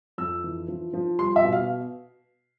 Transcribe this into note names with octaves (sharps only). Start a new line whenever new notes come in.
F2 E6
E3
F3
F3
G3 C6
E5
B2
F5